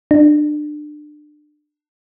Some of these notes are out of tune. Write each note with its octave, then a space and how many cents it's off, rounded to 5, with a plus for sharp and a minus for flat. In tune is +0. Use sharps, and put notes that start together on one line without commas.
D4 +25